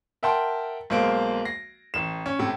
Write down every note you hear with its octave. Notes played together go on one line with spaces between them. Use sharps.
A#4 E5 F#5 G5 A5 C6
B1 G#3 A#3 C5 D7
A#6 C7
A1 E7
C#4
A2 C3